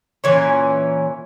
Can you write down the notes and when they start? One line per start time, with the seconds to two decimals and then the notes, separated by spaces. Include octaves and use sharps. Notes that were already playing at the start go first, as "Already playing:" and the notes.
0.24 A#2 E3 C#4